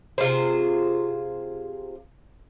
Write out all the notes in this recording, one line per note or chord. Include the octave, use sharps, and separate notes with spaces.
C3 F4 G#4 C5